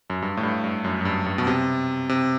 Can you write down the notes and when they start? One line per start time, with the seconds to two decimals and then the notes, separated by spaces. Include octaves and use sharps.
0.10 F#2
0.22 G2
0.37 A2
0.43 G2
0.64 G2
0.84 F#2
1.01 F#2
1.05 G2
1.26 G2
1.38 B2
1.47 C3
2.09 C3